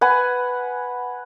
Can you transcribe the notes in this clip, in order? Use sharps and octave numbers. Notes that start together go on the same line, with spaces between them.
B4 F#5 G#5